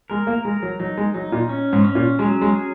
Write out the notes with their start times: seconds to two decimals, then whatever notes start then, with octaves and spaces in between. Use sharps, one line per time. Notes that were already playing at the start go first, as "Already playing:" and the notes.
0.10 G#3 A#4
0.27 A#3
0.45 G#3 A#4
0.62 F#3
0.79 F#3 D#4
0.97 G#3
1.14 F#3 D#4
1.32 A#2
1.49 C#4
1.73 G#2
1.85 C#4
1.95 A#2
2.19 F#3 G#3
2.42 G#3
2.54 G#4